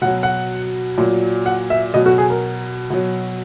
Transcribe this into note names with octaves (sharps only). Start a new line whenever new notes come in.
B2 F#3 F#5
F#5
A#2 F#3
F#5
E5
B2 F#3 D#5
F#4
G#4
A#4
B2 F#3